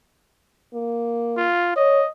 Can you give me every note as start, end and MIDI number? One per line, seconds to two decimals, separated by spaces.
0.74 1.48 58
1.37 1.75 65
1.76 2.03 73
1.76 2.09 75